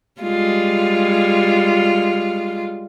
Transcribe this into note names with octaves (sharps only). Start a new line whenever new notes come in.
G3 G#3 F4